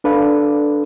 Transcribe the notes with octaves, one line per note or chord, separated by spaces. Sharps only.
D4 A4 B4 D5 F5